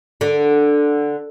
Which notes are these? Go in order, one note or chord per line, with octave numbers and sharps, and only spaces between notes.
D3